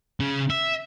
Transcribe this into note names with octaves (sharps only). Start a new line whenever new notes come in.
C#3 C#4
E5